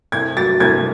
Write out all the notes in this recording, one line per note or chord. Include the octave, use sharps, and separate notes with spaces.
C2 G#6
F#3 A6
C2 G#6